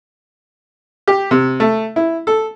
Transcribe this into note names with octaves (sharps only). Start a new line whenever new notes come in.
G4
C3
A3
E4
A4